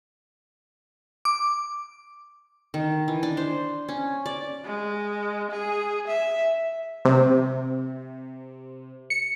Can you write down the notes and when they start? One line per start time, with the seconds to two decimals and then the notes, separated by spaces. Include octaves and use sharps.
1.25 D6
2.74 D#3
3.08 E3
3.23 D4
3.37 C5
3.89 C#4
4.26 D5
4.64 G#3
5.51 G#4
6.07 E5
7.05 C3
9.10 C#7